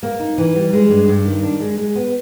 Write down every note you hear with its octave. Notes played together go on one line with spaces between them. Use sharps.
A#3
D#4
E3
G3
G#3
G2
G2
D#3
D4
G#3
G#3
B3